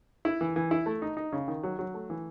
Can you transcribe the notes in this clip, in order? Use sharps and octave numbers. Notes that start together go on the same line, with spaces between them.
E4
E3
E3
E4
A3
D#4
D#4
C#3
D#3
F#3
F#3
A3
E3